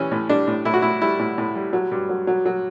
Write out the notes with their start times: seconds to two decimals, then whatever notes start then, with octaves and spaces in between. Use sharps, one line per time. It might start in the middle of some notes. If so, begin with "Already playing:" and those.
Already playing: E3 G3 C#4
0.12 A2
0.29 G3 D4
0.48 A2
0.65 A2 E4
0.74 F#4
0.82 A2 E4
1.02 G3 E4
1.19 A2
1.38 A2
1.55 G3
1.73 F#3
1.91 G2
2.09 F#3
2.27 F#3
2.46 F#3